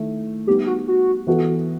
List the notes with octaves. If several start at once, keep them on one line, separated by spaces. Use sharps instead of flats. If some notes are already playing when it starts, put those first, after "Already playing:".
Already playing: D#3 A3 E4
G3 B3 D#4 G4
F#4
F#4
E3 B3 F#4 A4